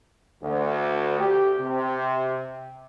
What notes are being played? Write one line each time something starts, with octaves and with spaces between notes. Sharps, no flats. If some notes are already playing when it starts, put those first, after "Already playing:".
D2
G4
C3